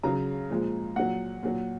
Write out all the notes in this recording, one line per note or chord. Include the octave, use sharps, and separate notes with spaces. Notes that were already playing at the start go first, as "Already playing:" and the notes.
C#3 F#3 A#5
A#2 F3 G#3
A#2 F#3 F#5
A#2 F#3